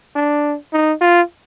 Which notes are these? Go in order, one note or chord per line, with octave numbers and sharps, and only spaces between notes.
D4
D#4
F4